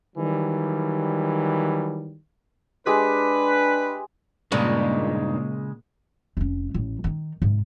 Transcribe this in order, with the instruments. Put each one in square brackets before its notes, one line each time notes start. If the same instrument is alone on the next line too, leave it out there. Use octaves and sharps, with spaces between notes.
[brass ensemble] D#3 E3 F#3 G3
[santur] G#3 G4 [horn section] D4 B4
[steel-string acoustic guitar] G2 D#4 [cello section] A#2 [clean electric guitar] C#3 G#3
[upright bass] F1 C#4
A1 A2
D#3 D#4
G#2 C3